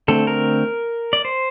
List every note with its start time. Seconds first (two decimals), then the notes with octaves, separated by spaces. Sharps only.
0.08 D3 A3 C4 A4
0.27 A#4
1.13 D5
1.25 C5